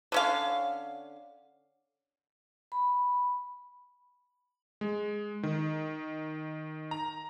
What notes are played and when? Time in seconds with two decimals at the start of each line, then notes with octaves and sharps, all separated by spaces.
0.12 D3 C#4 F5
2.72 B5
4.81 G#3
5.43 D#3
6.91 A#5